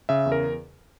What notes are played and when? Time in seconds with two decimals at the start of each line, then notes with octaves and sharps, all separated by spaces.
0.09 C#3 E5
0.26 E2
0.32 A#4